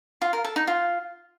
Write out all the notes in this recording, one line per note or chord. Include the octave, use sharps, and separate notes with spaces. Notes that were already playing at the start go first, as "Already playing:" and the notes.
F4
A#4
A4
D#4
F4